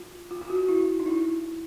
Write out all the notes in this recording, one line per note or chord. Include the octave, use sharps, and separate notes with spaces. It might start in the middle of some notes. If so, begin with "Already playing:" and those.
Already playing: F4
F4
F4
F#4
E4
D#4
E4